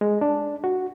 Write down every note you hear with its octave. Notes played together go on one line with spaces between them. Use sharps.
G#3
D4
F#4